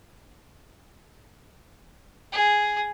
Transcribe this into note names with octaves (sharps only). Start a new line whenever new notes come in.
G#4